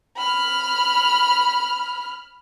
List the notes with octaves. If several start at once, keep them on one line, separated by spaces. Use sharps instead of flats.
B5 F6